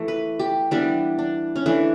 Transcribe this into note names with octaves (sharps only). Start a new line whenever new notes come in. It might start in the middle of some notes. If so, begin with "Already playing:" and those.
Already playing: E3 A3
B4
G4
E3 G3 B3 D4
D4
C#4
E3 A3 D4